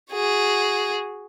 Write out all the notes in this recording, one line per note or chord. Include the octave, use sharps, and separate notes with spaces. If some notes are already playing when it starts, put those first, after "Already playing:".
F#4 G#4